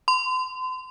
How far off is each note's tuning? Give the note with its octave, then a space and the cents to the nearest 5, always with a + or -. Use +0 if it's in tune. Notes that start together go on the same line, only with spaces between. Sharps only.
C6 -40